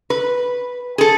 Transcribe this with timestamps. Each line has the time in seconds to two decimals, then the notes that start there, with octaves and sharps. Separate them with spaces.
0.10 B4
0.98 G#4 A4